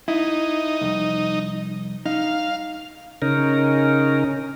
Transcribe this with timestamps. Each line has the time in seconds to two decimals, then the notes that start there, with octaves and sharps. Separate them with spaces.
0.08 D#4 E4
0.81 C2 F2
2.06 D#4 F5
3.22 C#3 C#4 D#4 A#4